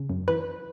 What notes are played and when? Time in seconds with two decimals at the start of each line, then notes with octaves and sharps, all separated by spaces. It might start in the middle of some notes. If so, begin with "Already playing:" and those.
Already playing: C#3
0.10 F#2
0.28 E3 B4